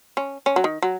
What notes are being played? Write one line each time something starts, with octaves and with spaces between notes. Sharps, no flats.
C#4
C#4
F#3
D#3
F#3